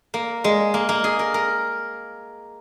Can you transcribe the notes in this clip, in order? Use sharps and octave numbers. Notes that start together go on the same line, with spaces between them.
A#3
G#3
A#3
A#3
G#4
A#4
A#4